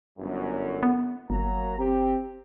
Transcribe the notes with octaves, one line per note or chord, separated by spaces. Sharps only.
G1 F#2
B3
G1 F#3 A#3 A#5
C4 G4